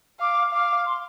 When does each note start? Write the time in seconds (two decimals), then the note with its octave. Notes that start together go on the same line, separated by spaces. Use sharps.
0.20 F5 D6
0.53 F5 D6
0.86 C6